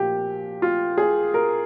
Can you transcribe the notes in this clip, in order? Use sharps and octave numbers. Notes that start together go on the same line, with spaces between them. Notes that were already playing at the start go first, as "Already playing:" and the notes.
Already playing: A#2 F3 G4
F4
G#4
A#4